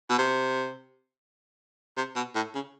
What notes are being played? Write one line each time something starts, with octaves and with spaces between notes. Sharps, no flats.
B2
C3
C3
B2
A2
C#3